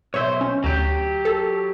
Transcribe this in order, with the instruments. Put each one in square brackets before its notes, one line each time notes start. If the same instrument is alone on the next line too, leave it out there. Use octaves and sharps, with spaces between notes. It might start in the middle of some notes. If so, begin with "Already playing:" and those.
[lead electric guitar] B1 C5 [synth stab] C#5 E5
[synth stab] C#4
[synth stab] D2 [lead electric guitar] F#3 G4
[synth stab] A4